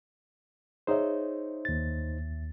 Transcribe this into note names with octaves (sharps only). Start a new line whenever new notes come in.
D#4 G#4 C5 C#5 E5
D#2 A6